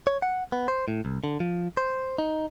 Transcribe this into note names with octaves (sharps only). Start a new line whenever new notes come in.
C#5
F#5
B3
C5
A2
C2
D3
F3
C5
D#4